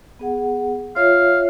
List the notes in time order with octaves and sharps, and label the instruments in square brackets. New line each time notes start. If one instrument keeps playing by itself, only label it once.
[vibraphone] B3 G#4 F#5
[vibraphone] F4 C#5 E5 [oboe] F5